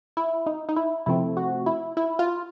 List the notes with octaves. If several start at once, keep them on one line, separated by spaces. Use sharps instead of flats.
E4
D#4
D#4
E4
C3 F3 A3 C4 E4
F#4
E4
E4
F4